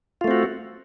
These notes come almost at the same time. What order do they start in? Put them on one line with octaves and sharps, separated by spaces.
F4 A3 C4 F#4